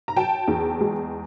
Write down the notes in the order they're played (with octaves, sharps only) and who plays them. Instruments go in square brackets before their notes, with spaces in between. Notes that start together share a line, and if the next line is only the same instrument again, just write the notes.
[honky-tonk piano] A#5
F#3 G5 A5
E2
G#3